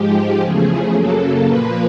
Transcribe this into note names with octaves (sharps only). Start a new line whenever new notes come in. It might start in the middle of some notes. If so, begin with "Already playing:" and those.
Already playing: G#2 F3 G#3 G4
E2 C#3 F3 A3 G#4
F#2 C#3 F#3 A#3 A4
A#2 F3 A#3 B4